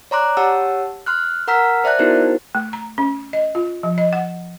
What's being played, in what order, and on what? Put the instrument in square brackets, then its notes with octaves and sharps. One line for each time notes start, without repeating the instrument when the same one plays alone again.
[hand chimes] C#5 D5 A#5 C6 D6 F#6
G4 C#5 F#5 A5 E6
C6 F6 F#6
A#4 F#5 A#5 E6 F6 B6
C5 D5 E5 A5 F#6
B3 D#4 E4 F#4 A#4 C5
[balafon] A3
A#5
C#4
D#5
F4
F3
D#5
F#5